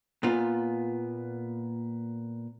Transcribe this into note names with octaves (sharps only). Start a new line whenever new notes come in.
A#2 B3 F4